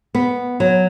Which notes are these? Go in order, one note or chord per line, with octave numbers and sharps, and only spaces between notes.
B3
F#3